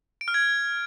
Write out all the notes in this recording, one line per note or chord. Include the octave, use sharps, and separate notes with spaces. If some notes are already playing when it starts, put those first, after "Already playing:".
D7
F6
G#6